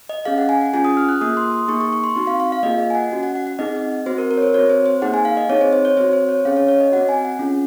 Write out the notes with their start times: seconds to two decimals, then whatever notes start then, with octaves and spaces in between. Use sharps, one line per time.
0.09 D#5
0.25 C#4 G#4 F5
0.38 F#5
0.49 G#5
0.61 F#5
0.73 C#4 F4 G#4 G#5
0.85 D#6
0.97 F6
1.09 F#6
1.21 A#3 F4 G#4 D#6
1.37 C6
1.52 D#6
1.68 A#3 D#4 G#4 C#6
1.81 C#6
1.93 C#6
2.04 C6
2.15 C4 D#4 F#4 C#6
2.27 F5
2.40 F5
2.52 F5
2.63 A#3 F4 G#4 D#5
2.79 D#5
2.90 G#5
2.95 F#5
3.12 C#4 F#4
3.23 F#5
3.35 F#5
3.47 F#5
3.59 C4 D#4 G#4 D#5
4.06 C4 F#4 C5
4.18 A#4
4.31 A#4
4.38 C#5
4.42 C5
4.54 C4 F#4 C#5
4.70 C5
4.86 C5
5.02 A#3 D#4 G#4 F#5
5.14 G#5
5.25 F5
5.37 D#5
5.49 C4 D#4 G#4 C#5
5.61 C5
5.73 C5
5.85 C#5
5.97 C4 F#4 C5
6.13 C5
6.29 C#5
6.45 C#4 G#4 F5
6.57 C#5
6.68 C#5
6.80 D#5
6.92 C4 F#4 F#5
7.09 G#5
7.25 F#5
7.39 C#4 F4 G#4